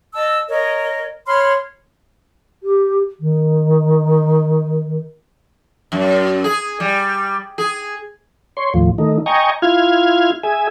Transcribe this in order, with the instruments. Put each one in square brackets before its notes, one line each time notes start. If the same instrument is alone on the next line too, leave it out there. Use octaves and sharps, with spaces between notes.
[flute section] D#5 A5 E6
A#4 C#5 D#5
C#5 B5 C6 F6
[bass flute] G4
D#3
[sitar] F#2
G#4
G3
G#4
[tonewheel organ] C#5 C6
D#2 A2 F3
D#3 A3 D#4
D#5 G5 G#5 A#5 C#6
E4 F4 F6 G#6
G#4 E5 G#5